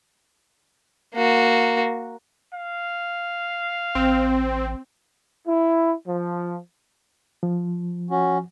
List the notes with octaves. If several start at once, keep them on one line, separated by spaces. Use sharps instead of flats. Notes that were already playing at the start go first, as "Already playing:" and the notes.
A#3 F#4
F5
A1 C4
E4
F3
F3
C#4 F#4